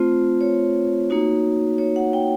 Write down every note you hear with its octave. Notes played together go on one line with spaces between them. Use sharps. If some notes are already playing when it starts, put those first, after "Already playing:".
Already playing: A3 C4 F4 C5
C#5
A#3 D#4 F#4
C#5
F#5
G5